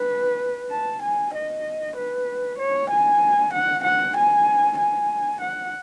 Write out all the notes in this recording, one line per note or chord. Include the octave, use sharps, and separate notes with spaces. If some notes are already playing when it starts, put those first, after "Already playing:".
Already playing: B4
A5
G#5
D#5
B4
C#5
G#5
F#5
F#5
G#5
G#5
F#5